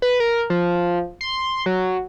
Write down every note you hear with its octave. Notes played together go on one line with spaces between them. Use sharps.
B4
A#4
F3
C6
F#3